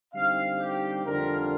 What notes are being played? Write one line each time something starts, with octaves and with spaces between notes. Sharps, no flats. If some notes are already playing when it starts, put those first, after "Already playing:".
D3 G3 C4 D#4 F5
G4
F2 D3 G3 D4 F4 A#4